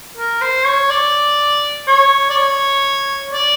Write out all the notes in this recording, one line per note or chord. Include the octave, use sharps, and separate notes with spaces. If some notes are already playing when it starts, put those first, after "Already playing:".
A#4
C5
C#5
D5
C#5
D5
C#5
D5